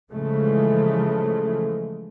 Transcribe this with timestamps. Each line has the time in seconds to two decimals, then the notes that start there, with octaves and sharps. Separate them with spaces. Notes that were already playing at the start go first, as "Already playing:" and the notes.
0.11 C#3 E3 F3 G#3 A3